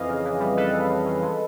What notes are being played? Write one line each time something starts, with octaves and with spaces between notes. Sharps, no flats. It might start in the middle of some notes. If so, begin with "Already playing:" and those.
Already playing: F2 E3 D#5 F5
C#3
E3
G3
G3 A4 B4
C#3
G3
C#3
G#3